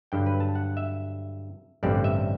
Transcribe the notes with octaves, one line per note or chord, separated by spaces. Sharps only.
G2 D3 F#3 G5
B4
A5
F#5
E5
A1 G2 D3 G3 C4 D5
E5